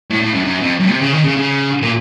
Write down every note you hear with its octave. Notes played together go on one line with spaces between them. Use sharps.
A2
A2
F#2
F#2
F2
F#2
C3
C#3
D#3
C#3
C#3
A#2